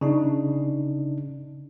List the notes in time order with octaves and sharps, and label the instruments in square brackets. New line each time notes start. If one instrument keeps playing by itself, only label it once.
[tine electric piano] C#3 D4 D#4